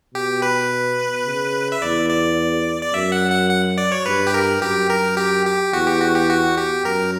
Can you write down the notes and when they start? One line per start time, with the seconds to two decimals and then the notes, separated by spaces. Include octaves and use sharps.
0.14 B2 G4
0.42 B4
1.26 C#3
1.72 E5
1.82 E2 D5
2.09 D5
2.83 D5
2.94 F#2 E5
3.12 F#5
3.31 F#5
3.49 F#5
3.78 D5
3.92 C#5
4.06 G2 B4
4.27 G4
4.34 A#4
4.61 F#2 G4
4.90 A#4
5.17 G4
5.46 G4
5.73 E2 F#4
5.87 G4
6.01 F#4
6.15 G4
6.30 F#4
6.58 G4
6.85 F#2 A#4